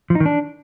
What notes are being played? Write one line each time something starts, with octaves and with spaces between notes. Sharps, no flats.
F3
D#4
D#3
D4